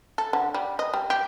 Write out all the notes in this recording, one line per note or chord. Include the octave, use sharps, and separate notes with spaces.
A4
D3
G3
D#5
G3
G4